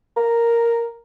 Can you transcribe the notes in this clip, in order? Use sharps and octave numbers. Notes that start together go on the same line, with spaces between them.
A#4